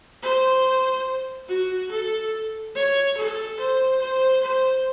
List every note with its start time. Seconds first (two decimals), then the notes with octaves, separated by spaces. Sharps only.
0.23 C5
1.48 F#4
1.91 A4
2.75 C#5
3.17 A4
3.60 C5
4.01 C5
4.43 C5